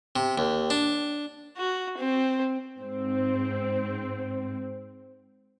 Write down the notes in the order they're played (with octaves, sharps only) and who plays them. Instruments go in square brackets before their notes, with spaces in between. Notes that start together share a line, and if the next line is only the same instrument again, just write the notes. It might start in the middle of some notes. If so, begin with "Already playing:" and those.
[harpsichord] C3
D#2
D4
[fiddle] F#4
C4
[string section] G#2 C4